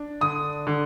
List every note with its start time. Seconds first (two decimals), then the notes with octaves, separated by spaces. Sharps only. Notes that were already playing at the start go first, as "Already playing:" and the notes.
Already playing: D4
0.21 D3 D#6
0.67 D3